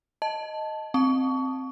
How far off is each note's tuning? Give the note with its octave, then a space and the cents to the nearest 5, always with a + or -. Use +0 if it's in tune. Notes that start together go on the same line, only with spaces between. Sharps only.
D#5 +0 A5 +0
C4 +0 A5 +0 C#6 +30